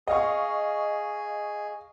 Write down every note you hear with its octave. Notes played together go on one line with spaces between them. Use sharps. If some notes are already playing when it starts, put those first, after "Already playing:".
G#4 D#5 F5 C#6